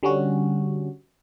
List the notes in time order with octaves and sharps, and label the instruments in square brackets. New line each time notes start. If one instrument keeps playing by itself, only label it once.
[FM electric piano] D3 G3 C#4 F#4